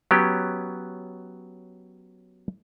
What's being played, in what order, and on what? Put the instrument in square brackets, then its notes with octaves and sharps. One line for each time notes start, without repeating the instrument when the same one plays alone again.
[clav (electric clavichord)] F#3 B3 C#4 G4